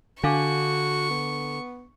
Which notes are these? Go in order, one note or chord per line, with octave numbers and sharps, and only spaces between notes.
D3 D4 F#4 F5 C#6 D6
B3